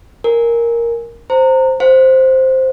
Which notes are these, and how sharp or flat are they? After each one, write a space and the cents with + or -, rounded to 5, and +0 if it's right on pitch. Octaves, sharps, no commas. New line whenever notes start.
A#4 +0 G#5 +0
C5 +0 A#5 -25
C5 +0 F5 +45